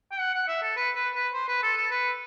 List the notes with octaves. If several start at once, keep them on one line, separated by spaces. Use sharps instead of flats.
G5
F#5
F#5
E5
A4
B4
B4
B4
C5
B4
A4
A4
B4